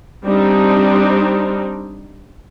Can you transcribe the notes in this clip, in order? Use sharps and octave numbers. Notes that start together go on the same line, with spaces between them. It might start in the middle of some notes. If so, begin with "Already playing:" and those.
G3 C4 D4 D#4